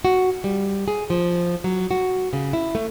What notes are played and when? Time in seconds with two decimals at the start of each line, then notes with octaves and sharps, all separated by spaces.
0.05 F#4
0.44 G3
0.88 G#4
1.10 F3
1.64 F#3
1.91 F#4
2.33 C#3
2.53 E4
2.75 A3